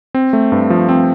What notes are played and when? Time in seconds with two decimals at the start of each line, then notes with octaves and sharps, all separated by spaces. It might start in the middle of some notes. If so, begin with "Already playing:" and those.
0.14 C4
0.33 A3
0.52 G2
0.70 F3
0.89 C4